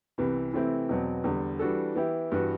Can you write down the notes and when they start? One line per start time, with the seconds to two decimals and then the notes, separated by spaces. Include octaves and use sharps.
0.18 C2 C3 E3 B3
0.53 C3 E3 A3 C4 E4
0.89 E2 B2 F#3 C4
1.24 E2 D3 G3
1.59 E3 G3 D4 F#4 A4
1.96 E3 B3 E4 G4
2.31 G2 E3 B3 F#4 B4